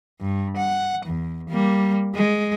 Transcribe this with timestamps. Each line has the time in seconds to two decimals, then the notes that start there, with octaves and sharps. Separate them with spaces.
0.20 G2
0.57 F#5
1.06 E2
1.49 G3 A#3
2.14 G#3